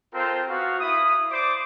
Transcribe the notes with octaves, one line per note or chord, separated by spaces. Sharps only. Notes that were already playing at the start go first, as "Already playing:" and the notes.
C4 F4 A4 A#4 C5
B3 F#4 F5
E4 B5 D#6
C5 D5 D6